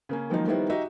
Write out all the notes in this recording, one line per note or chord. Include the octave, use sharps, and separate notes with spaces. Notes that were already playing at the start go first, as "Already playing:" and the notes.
C#3 A#3 C#4
D#3 F3 F#3 G#3 A#3 D#4
D#3 G3 B3 D#4 E4 C5
D#4 F#4 G4 D#5 E5